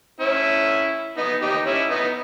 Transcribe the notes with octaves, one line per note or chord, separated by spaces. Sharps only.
C#4 E4
B3 D#4
D#4 G4
C#4 E4
B3 D#4